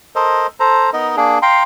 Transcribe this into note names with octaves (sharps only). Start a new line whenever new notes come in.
A4 A#4 C5 D#5
A4 C5 A#5
B3 D#4 A#4 D#5
A#3 D4 G#4
F5 G5 A#5 C6